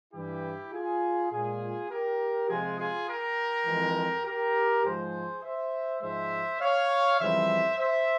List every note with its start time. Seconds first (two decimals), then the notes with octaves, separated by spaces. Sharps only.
0.14 G2 E3 G3 E4 G4
0.72 F4 G#4
1.31 A#2 G#3 F4 G#4
1.90 G4 A#4
2.49 F2 C3 F3 G#3 F4 G#4
2.78 F4 G#4
3.08 G4 A#4
3.66 F2 E3 G#3
4.25 G4 A#4
4.83 G#2 F3 G#3 G#4 C5
5.43 C5 E5
6.01 G#2 F3 G#3 C5 E5
6.60 C#5 F5
7.19 F2 C#3 E3 G3 C5 E5
7.78 C5 E5